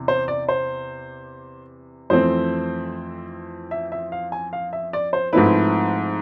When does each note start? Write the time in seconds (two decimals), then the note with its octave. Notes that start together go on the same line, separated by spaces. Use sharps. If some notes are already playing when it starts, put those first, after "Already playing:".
Already playing: E2 C3
0.08 C5
0.28 D5
0.49 C5
2.10 F2 E3 A3 C4 C5
3.71 E5
3.92 E5
4.12 F5
4.32 G#5
4.53 F5
4.73 E5
4.93 D5
5.13 C5
5.33 G#2 F3 A3 C4 E4 B4